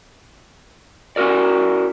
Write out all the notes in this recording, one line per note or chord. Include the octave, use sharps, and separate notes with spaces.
C#4 E4 F#4 A#4 D5